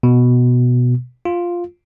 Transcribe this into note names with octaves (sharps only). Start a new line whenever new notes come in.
B2
F4